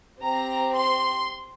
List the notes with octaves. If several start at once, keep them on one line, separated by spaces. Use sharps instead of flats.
C4 G4 A#5
C6